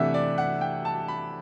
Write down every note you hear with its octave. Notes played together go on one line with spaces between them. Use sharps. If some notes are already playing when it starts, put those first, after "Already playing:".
Already playing: C3 E3 A3 D4 E5 F#5
D5
F#5
G5
A5
B5